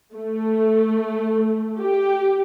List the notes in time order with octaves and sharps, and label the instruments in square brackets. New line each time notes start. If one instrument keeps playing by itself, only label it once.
[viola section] A3
G4